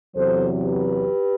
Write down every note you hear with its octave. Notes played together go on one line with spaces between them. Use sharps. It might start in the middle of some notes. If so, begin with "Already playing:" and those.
E2 C3 F#3 A4 C5
G4 B4